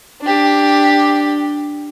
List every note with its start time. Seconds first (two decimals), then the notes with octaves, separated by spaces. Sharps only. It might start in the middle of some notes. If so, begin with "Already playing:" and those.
0.21 D4 G4